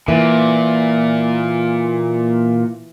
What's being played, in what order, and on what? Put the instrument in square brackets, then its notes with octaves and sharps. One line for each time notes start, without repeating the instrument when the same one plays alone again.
[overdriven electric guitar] A#2 [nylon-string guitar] E3